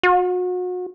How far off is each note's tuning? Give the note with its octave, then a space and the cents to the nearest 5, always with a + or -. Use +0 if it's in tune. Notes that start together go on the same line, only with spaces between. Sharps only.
F#4 -35